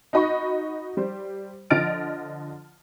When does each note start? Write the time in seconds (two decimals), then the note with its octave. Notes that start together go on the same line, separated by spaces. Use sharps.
0.13 D#4 F#4 D#5 B5 C#6
0.97 G3 C5
1.70 D3 F3 D#5 F6 A6 D7